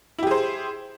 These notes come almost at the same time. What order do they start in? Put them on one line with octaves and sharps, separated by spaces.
E4 G4 G#4 C5